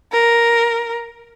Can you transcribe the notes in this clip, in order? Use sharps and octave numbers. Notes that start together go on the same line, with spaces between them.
A#4